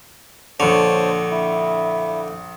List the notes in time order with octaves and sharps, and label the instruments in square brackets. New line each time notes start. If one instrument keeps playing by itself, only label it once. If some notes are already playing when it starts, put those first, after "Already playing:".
[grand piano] A#1 C#6 [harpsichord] D3 [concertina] C5 C#5 A5
[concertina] E4